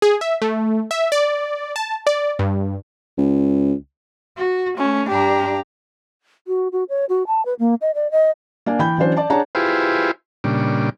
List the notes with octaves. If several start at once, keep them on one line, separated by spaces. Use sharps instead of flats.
G#4
E5
A3
E5
D5
A5
D5
G2
C#2
F#4
A3 C#4
G2 D4 G4 A#5
F#4
F#4
C#5
F#4
A5
B4
A#3
D#5
D5
D#5
A#3 D4 G#5
E3 G5 B5 G6
E3 F#3 C#4 D4 C5
D5 A5
D4 G#4 C#5 F#5 A5 A#5
E4 F4 G4 G#4 B4 C5
A#2 C#3 G3 D4